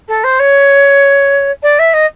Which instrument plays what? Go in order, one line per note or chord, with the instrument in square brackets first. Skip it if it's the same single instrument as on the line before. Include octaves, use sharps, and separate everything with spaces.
[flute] A4
C5
C#5
D5
E5
D#5